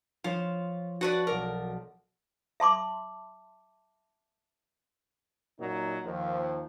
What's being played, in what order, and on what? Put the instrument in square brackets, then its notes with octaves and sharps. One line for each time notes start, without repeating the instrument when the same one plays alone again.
[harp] F3 C#5 E7 [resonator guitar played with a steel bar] F4
[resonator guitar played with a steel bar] F#4 B4 D5 [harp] A5
[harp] B1 D5 [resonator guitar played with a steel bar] A#4
[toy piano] E5 A5 C6 D6
[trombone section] F#2 A#2 F#3 D#4
D#2 F3